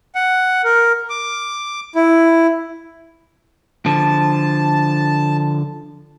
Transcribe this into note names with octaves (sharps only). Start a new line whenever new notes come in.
F#5
A#4
D6
E4
D3 F3 A5